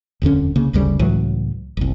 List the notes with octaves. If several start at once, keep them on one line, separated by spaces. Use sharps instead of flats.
D#1 F2 D3 C#4
C2 C#3 A#3
G1 D2 C#3 G3
C#2 A2 E3 F#3
F#1 C2